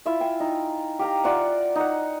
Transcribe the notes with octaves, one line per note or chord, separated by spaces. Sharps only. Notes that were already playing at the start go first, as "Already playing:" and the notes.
E4 F4 E5
G5 G#5
D#4
G4 F5 G5 A#5
F4 D5 E5 F#5
D#4 F#5